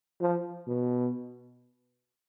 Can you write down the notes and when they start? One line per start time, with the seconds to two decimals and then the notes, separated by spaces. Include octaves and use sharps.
0.21 F3
0.67 B2